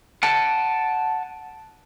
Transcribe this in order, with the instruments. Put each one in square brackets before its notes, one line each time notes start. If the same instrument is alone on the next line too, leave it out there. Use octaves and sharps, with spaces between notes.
[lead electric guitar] F#5 A5